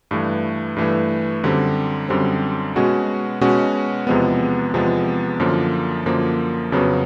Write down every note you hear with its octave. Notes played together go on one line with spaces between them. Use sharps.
G2 E3 A3
G2 E3 A3
F#2 D3 G3 C4
F#2 D3 G3 C4
B2 G#3 C#4 F#4
B2 G#3 C#4 F#4
E2 C3 F3 G#3 B3
E2 C3 F3 G#3 B3
F#2 D3 F3 A#3
F#2 D3 F3 A#3
F2 C#3 F#3 B3